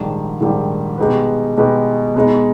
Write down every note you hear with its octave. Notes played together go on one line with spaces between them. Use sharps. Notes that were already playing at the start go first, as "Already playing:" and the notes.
Already playing: A#1 G#2 D#3 G3
A#1 G#2 D#3 G3
B2 G#3 D#4 G4 B4
B2 G#3 D#4 G4 B4
B2 G#3 B3 D#4